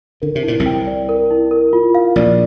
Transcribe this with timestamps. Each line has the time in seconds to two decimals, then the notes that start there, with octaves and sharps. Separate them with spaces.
0.22 D3 A#4
0.35 C3
0.43 A#2 E4
0.60 C2 C3
0.66 G5
0.87 D5
1.09 A#4
1.30 E4
1.51 A#4
1.73 F4
1.95 F5
2.16 A#1 A#2 D5